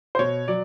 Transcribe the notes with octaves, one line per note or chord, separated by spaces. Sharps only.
C5
B2 C#5
F#3 D5